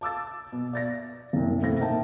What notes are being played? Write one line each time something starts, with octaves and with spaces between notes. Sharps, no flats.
A5 D6 E6 A6
B2
D5 A6 A#6
F#1 C2
E1 A2 C4 A#6
A#3 D#4 G5 A5